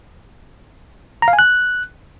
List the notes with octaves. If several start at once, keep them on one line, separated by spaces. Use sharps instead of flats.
A#5
F5
G#5
F#6